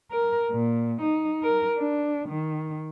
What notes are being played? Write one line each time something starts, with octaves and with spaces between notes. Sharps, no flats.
A#4
A#2
D#4
A#4
D4
D#3